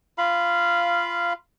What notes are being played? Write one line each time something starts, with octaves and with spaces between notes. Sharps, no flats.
F4 F5 B5